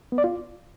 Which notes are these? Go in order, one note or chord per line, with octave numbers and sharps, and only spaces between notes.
B3
D5
F4